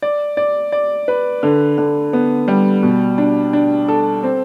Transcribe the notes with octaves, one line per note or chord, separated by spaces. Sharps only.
D5
D5
D5
B4
D3
D3
B3
G3
B2
D4
D4
A4
C4